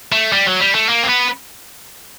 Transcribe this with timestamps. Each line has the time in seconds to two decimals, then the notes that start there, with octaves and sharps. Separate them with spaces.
0.12 A3
0.33 G3
0.46 F#3
0.60 G3
0.75 A3
0.89 A#3
1.04 C4
1.09 B3